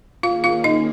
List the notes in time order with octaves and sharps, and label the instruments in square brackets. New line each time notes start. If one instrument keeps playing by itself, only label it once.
[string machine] D#3 A#3 C#4 G#4 [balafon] F4 F5
[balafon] F4 F5
D#4 D#5